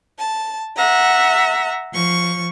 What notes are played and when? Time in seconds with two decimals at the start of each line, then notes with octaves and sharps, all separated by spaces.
0.18 A5
0.76 E5 F#5 A#5
1.93 F3 C#6